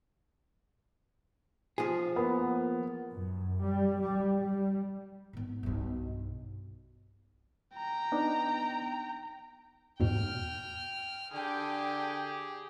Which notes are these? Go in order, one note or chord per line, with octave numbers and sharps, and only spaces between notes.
F3 G#4
A#3 B3
F#2
G3
G3
G3
G#1 B3
B1 G2
G5 A#5
B3 D4 D#4
E2 G#2 B2 G5 F6
D3 G4 G#4 G5